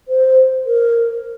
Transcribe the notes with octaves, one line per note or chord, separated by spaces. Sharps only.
C5
A#4